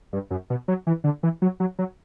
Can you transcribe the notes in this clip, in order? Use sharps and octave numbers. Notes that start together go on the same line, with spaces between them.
G2
F#2
B2
F#3
E3
D3
E3
F#3
F#3
F#3